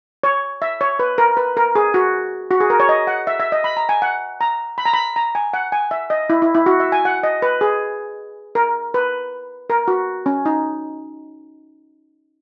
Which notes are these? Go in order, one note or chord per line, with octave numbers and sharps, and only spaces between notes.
C#5
E5
C#5
B4
A#4
B4
A#4
G#4
F#4
F#4
G#4
A#4
C#5
D#5
F#5
E5
E5
D#5
B5
A#5
G#5
F#5
A#5
B5
A#5
B5
A#5
G#5
F#5
G#5
E5
D#5
E4
E4
E4
F#4
E5
G#5
F#5
D#5
B4
G#4
A#4
B4
A#4
F#4
C#4
D#4